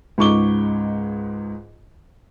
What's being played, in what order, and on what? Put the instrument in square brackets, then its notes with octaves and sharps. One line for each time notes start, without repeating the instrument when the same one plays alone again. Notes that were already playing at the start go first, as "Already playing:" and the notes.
[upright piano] C#2 G#2 D#4 C#6 D6 G7